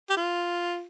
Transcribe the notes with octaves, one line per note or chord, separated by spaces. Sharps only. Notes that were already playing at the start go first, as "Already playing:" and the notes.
G4
F4